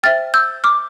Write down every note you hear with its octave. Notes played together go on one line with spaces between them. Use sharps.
C5 E5 G5 F6 A6
E6 G6
D6 F6